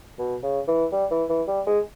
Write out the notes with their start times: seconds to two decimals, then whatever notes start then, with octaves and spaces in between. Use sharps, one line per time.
0.18 B2
0.43 C#3
0.68 E3
0.92 G3
1.11 E3
1.30 E3
1.48 G3
1.66 G#3